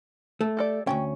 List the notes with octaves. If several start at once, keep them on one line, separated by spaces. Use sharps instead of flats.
A3
G4 A4 D5
D2 G#2 C#4 G5